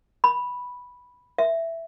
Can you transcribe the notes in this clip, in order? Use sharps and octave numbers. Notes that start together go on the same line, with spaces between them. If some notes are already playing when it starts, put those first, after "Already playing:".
B5
E5